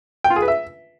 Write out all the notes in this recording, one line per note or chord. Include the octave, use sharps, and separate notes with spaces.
G5
F4
G#4
B4
E5